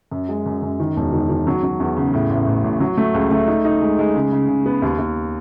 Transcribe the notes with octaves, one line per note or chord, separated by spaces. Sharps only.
F#2
G#3
F#2
F#2
D#3
E1
D#3
D#3
F#3
F#3
E2
C#3
A2
A1
A1
A1
F#3
A3
C#2
A3
D#4
D#4
G#3
G#3
C#3
C#3
C#3
B3
D#2
D#2